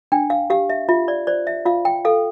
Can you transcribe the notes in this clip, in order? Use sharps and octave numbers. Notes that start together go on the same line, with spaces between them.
D4 G5
F5
G4 F5
E5
F4 E5
D5
C5 D5
E5
F4 F5
G5
A4 F5